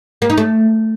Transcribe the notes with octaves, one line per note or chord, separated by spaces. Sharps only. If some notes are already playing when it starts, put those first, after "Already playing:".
A#3
D#4
A3